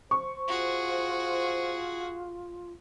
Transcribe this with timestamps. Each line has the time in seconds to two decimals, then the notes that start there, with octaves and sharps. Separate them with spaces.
0.11 C5 C#6
0.48 F4 F#4 G#4